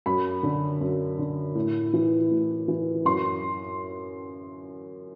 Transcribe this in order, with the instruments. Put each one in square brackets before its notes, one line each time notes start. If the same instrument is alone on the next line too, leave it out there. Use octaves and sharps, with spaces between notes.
[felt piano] F#2 B5
D3
F#2
D3
A2
E3
A2
E3
F#2 C6